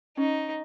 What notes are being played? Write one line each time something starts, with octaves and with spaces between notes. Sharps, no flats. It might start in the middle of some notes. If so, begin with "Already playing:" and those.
C#4 D#4